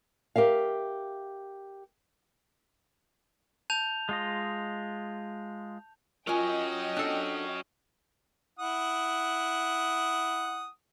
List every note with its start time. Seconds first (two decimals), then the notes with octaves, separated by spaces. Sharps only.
0.36 G4 A#4 E5 F5
3.70 A5 G6 F7
4.09 G#3 F4 D#5
6.27 F#3 C#4 F4 A#4 D#5 G5 G#5
6.97 D4 A4
8.59 E4 F#5 D#6